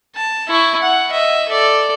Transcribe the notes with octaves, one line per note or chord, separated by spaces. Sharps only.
A5
E4 C#6
F#5
D#5 E5
A4 D5